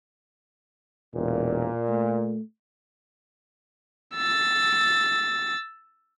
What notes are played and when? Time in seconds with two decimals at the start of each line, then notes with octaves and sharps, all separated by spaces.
1.14 E1 A#2
1.89 A3
4.15 E6 A6